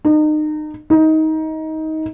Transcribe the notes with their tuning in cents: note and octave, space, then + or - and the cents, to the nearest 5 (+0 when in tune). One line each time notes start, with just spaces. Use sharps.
D#4 -30
D#4 +20